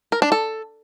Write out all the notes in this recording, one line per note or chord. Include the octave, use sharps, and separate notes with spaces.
A#4
D4
A4